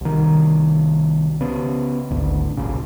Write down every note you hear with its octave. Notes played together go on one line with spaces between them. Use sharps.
C2 D#3
C#3 B3
G#1 D2
B1 A#2 C#3